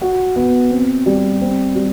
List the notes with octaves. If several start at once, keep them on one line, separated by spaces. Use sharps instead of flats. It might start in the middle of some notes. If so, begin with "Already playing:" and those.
F#4
B3
C4
G3
C4
G3